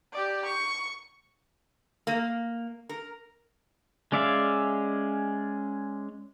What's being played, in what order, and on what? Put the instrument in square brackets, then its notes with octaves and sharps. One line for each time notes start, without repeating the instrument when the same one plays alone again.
[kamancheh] G4 D5
C#6
[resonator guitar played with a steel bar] A#3
A#4
[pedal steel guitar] G#3 C#4 D5 E5 F5